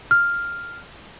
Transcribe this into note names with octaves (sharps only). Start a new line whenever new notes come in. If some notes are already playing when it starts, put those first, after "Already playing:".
F6